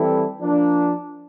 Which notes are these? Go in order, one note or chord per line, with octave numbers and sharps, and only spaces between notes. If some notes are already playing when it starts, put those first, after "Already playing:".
Already playing: E3 G3 C4 E4 A4
F3 A#3 D4